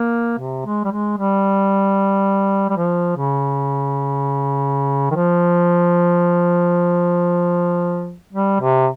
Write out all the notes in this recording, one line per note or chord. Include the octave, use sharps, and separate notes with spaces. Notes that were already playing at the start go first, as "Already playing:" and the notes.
Already playing: A#3
C3
G#3
G3
G#3
G3
G3
F3
C#3
D#3
F3
G3
C3